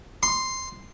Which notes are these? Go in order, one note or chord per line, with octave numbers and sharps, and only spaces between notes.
C6